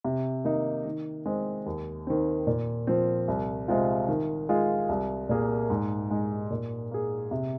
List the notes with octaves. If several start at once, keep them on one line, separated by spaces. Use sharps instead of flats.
C3
D#3 A#3 D#4
D#3
G#3 C4
D#2
D#3 C4
A#2
F3 C4
C2
C3 G#3 C4 F4
D#3
G#3 F4 G#4
C2
A#2 A#3 G#4
G#2
G#3 D#4
A#2
A#3 G#4
C3